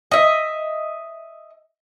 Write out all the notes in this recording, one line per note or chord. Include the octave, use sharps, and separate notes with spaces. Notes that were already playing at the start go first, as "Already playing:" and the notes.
D#5 E5